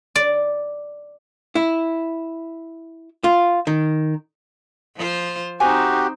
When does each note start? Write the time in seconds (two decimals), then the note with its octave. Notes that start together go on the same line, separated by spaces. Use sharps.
0.16 D5
1.55 E4
3.24 F4
3.67 D#3
4.96 F3 F4 C5
5.60 C4 D#4 F#4 G4 C5 G#5